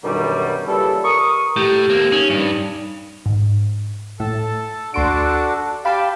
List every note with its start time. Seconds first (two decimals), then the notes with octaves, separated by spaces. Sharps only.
0.04 F#2 B2 D3 D#3 F#3 G3
0.67 A#2 C#3 E3 G3 E4 A4
1.04 A#4 C#6 D#6
1.56 A2 A3 G4
1.90 A#3 C4
2.12 C#4 D#4
2.30 G2
3.26 G#2
4.20 A2 A4
4.94 D2 D4 F#4 A4 C6 D7
5.85 G4 F5 G5 A5 B5